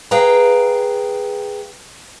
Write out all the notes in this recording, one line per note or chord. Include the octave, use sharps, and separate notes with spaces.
G#4 B4 F5 G5 A#5